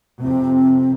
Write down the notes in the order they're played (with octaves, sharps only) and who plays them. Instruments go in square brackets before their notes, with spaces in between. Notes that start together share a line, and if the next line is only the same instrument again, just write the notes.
[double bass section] F2 C3 [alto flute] C4